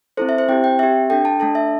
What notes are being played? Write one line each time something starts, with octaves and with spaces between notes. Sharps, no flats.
C4 E4 A4 C5
E5
C5
C4 E4 G4 G5
G5
C4 G4 E5
D4 A4 G5
A5
A3 D4 A4 A5
E5